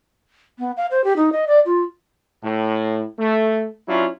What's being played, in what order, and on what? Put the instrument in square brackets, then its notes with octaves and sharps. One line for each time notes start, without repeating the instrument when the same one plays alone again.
[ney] B3
F5
C5
G4
D#4
D#5
D5
F4
[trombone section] A2
A3
F#3 C#4 D4 E4 F4